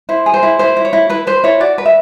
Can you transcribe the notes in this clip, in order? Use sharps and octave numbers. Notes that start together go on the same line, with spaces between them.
E4 C5
G#4
C5
E4
E4 C5
E4
C#5
E4
E4 B4
B4 C5
E4 C#5
F#4 D5
B4
E5